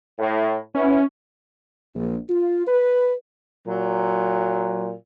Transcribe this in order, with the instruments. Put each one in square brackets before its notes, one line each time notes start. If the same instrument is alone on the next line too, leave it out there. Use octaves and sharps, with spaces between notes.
[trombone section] A2
[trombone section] B3 E4 [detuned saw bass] C#4
[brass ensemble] A#1
F4
B4
[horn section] A#2 F#3